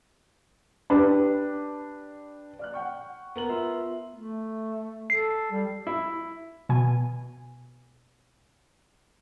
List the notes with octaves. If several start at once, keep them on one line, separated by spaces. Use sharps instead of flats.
D4 G4 B4
D5 F6 F#6
F#5 G5 C#6
B3 A#4 F#7
F4 E5
A3
A4 C7
G3
E4
B2 G#5